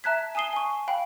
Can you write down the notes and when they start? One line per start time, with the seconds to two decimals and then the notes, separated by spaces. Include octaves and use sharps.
0.04 E5 A5 A#5 F#6 G#6 B6
0.35 G#5 A5 D#6 C7 G7
0.53 G#5 C#6
0.88 F5 G5 B5